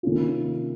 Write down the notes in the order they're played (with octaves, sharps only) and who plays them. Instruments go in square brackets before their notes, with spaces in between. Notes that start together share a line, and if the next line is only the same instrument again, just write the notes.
[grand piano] C3 D#3 A#3 C#4 F4